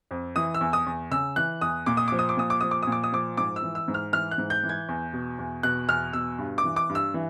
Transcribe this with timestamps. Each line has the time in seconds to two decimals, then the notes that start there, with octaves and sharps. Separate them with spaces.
0.11 F2
0.36 E3 D#6
0.54 E6
0.61 E2
0.73 D#6
0.86 E2
1.11 C#3 E6
1.36 E3 F#6
1.61 E2 D#6
1.86 A#2 D6
1.97 D#6
2.08 F3 D6
2.19 D#6
2.29 D6
2.37 A#2 D#6
2.50 D6
2.61 F3 D#6
2.71 D6
2.82 A#2 D#6
2.92 D6
3.04 D#6
3.12 F3 D6
3.37 G#2 D6
3.56 E6
3.62 E3
3.75 E6
3.88 G#2
3.94 F6
4.13 E3 F6
4.31 F#6
4.38 G#2
4.50 G6
4.63 E3
4.69 G#6
4.88 E2
5.13 B2
5.38 E2
5.63 B2 F#6
5.88 E2 F6
6.13 B2 E6
6.38 G2
6.58 D6
6.64 E3
6.76 D6
6.89 G2
6.95 E6
7.14 E3